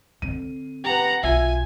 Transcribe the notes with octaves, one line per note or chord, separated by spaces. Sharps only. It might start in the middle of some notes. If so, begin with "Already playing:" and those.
D3 C4 D#7
G4 B4 F#5 A#5
B1 F4 E5 G#5